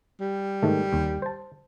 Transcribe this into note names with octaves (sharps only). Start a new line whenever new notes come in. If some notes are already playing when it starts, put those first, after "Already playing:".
G3
G#2 D#3 A3
D#2
C5 A5